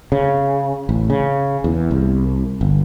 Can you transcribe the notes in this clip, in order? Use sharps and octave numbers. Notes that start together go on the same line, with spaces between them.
C#3
A1
C#3
E2
C2
G1